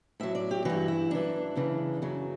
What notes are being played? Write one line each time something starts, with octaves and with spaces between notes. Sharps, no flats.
A2 F#3 E5
D5
G4
G2 E3 F#4
E4
F#2 E3 D4
F#2 C#3 E3
F#2 C#3 F#3